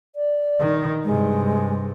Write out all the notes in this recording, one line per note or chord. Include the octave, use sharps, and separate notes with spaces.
D5
D#3
G2 C3 G#3